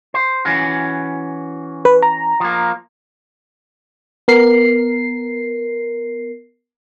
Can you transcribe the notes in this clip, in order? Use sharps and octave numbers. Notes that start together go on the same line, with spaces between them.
C5
E3 C#4 F#4
B4
A#5
F3 A#3
B3 A#4 C7